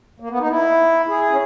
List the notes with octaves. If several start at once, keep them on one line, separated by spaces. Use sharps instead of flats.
A#3
B3
D#4
E4
G#4
C#4